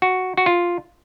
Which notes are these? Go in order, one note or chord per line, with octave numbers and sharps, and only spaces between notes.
F#4
F#4
F4